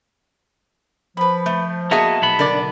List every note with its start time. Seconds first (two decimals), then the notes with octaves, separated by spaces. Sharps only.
1.17 F3 B4 B5
1.46 A3
1.91 A#3 B3 F#4 G#4 D#5 E5 A5
2.22 B1 B3 B5
2.39 D3 A#4 D5 D6